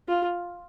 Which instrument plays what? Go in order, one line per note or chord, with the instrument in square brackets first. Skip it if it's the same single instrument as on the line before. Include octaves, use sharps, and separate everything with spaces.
[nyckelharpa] F4